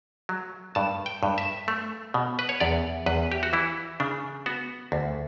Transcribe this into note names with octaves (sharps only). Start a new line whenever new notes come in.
F#3
G2 A5
G5
G2
E5
A3
B2
B4
C#5
E2 D5
E2 B4
G4
F#4
E3 E4
C#3 D4
B3 F#4
D2